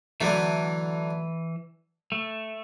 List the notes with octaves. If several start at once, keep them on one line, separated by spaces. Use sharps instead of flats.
D3 E3 F#3 A3
A3